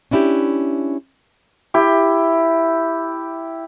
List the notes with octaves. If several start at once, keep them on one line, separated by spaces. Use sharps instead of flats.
C#4 D4 E4 F#4 G4
E4 G4